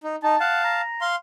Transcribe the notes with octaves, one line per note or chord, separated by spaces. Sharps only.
D#4
D#4 A5
F5 F#5 A5
A#5
F5 C6